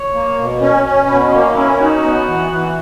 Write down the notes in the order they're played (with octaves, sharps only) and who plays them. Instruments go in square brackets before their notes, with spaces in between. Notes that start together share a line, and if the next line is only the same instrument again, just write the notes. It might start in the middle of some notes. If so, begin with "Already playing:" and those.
Already playing: [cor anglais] C#5
[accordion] A#3
B2
C#4
C#4
[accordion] B2 [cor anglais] B4
[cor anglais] B3
[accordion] A#3 [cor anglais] C#4
[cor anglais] D#4
[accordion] C#4 [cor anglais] E4
[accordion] D#4 [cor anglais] F#4
[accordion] B3
E3
E3